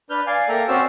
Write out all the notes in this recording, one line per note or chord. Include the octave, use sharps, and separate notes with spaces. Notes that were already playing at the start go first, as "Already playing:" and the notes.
D4 B4 F6 G6
D5 F5 G#5
A#3 A4 E5 G5 A#5
C4 C#4 F#4 C5 D5 E6